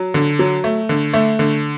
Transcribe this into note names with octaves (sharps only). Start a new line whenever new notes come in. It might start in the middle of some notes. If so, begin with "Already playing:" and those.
Already playing: F#3
D3
F#3
A3
D3
A3
D3